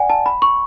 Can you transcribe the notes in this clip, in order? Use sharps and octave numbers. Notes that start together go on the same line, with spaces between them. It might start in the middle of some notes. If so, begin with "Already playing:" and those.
Already playing: D5 F#5 G#5
A5
B5
C#6